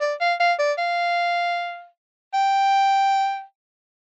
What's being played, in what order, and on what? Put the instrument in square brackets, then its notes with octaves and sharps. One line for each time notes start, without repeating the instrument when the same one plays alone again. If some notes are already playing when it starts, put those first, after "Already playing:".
[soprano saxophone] D5
F5
F5
D5
F5
G5